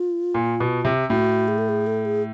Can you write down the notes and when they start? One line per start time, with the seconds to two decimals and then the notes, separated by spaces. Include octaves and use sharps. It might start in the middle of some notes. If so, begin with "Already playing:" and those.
Already playing: F4
0.34 A#2
0.60 B2
0.85 C3
1.10 A2 F#4
1.48 G#4
1.58 A4
1.69 G#4
1.87 A4
2.05 G#4